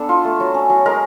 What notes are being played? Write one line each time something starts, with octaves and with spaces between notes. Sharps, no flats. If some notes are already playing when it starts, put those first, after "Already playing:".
Already playing: B3 D4 A4
F4
A3
F#3
C#4
F#3
G#3 A#4